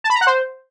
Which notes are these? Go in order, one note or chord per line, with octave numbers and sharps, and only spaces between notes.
A5
B5
A#5
F#5
C5